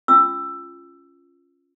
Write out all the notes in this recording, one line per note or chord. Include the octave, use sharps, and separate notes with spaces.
C#4 F4 E6